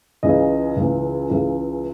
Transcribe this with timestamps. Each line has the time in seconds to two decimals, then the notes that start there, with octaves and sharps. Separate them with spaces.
0.23 C#2 C#3 E3 D#5
0.77 C#2 C#3 E3
1.30 C#2 C#3 E3